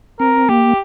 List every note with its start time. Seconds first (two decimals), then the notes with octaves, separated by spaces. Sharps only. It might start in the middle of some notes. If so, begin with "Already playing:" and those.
0.20 C4 A#4
0.49 A#3 G4